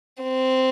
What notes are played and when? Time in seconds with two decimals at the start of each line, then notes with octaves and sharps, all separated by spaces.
0.23 C4